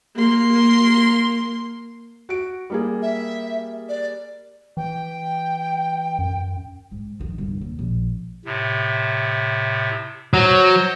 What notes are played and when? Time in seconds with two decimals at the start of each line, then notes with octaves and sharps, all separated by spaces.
0.16 A#3 C6
2.29 F#4 D7
2.70 G3 A#3 G#4
3.02 E5
3.89 D5
4.77 E3 G5
6.19 F#2
6.91 G#2
7.19 F2 D#3
7.38 G1 C2
7.61 D#2
7.79 A#1
8.45 A2 C3
10.34 F#3 C5 D#5